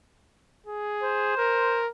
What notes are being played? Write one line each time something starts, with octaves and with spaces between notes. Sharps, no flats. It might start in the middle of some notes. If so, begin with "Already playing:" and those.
G#4
C5
A#4